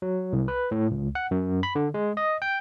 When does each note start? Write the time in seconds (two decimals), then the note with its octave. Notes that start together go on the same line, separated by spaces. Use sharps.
0.02 F#3
0.33 C2
0.48 B4
0.71 A2
0.91 C#2
1.15 F#5
1.31 F#2
1.63 B5
1.75 D3
1.94 G#3
2.17 D#5
2.42 G5